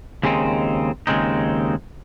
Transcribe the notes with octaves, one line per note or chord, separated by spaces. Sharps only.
D#2 C#3 G#3 C4 D#4
D#2 C#3 G#3 C4 D#4